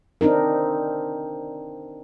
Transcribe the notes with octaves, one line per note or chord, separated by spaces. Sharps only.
C4 D4 D#4 A#4